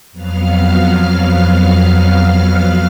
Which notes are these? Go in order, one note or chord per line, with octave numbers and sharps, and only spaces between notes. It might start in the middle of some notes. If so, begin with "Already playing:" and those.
F2 F#3 B3 F5 F6